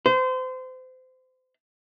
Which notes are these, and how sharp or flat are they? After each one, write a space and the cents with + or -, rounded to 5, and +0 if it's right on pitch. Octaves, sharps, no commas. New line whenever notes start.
C5 -30